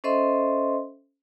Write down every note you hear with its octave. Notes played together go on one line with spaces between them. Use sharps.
C#4 A4 C5 D#5 E5 C6